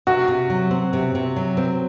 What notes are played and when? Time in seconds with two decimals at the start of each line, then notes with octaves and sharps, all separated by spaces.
0.07 C3 F#4
0.28 C3
0.50 F#3
0.71 C4
0.93 C3
1.15 C3
1.36 F#3
1.57 C4